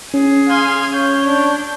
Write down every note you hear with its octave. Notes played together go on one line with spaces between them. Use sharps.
C#4 G#4
F5 G#5 C6
C#5 G6
D4